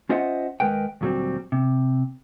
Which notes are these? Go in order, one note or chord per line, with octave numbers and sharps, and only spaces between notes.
C#4 F4 C5 D#5 E5 F#5
D#2 G#3 A#4 B4 G5
D2 A#2 F#3 G3 C4
C3